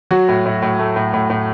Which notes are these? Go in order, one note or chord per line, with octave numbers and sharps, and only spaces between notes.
F#3 F#4
A2
A2
A2
A3
A2
A2
A2